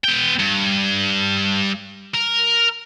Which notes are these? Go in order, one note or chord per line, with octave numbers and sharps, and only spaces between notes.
B3 G5
G2
A#4